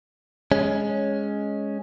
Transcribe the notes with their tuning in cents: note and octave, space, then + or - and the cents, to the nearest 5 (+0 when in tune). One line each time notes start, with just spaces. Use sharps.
G#3 +0 C#4 +0